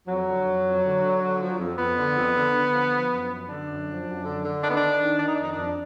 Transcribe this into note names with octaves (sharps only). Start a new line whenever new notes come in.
F2 F#3
D3
F2
F2
D3
D3
D3
F3
F2
F2 B3
D3
F2
D3
D3
F3
F3
F#2
F#2
D3 D4
F#2
F3
F#2
D3
D3
D#3 D4
B3
D#3 D4
D#3
D#3 D4
D#4
F2 D4
D#4
D4
F2